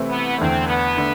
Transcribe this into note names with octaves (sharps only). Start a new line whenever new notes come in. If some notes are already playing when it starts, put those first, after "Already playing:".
Already playing: C3 E3 A3 C4 E4
B3
E2 D3 A3 C4
B3
D3 A3 D4